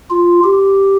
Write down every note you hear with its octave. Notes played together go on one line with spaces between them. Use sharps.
F4
G4